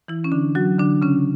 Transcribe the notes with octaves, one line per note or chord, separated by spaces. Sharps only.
E3 E4
C#4
D3 D4
F#3 F#4
D3 D4
C#3 C#4